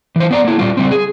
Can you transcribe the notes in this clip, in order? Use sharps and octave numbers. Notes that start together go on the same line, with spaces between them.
E3 C5
B3 D5 A#5
A#3 E4
A#2 G3 F4
C#3 G3 C4
G#4